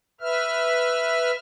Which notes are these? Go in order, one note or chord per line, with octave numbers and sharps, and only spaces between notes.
B4 E5 F6